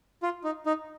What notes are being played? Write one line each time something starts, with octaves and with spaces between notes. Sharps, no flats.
F4
D#4
D#4